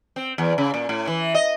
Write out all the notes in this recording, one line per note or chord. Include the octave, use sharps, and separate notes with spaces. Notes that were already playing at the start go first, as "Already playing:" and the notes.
C4
E2
C#3
A#2
A2
E3
D#5